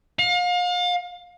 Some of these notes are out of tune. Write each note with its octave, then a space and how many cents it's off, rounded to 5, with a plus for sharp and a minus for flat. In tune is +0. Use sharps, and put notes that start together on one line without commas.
F5 +35